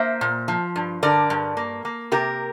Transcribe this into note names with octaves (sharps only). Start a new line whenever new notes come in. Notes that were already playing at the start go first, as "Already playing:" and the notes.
Already playing: A#3 C5 E5
A#2
F3
G2
D3 A#4 D5
G2
A#3
A#3
C3 G4 A#4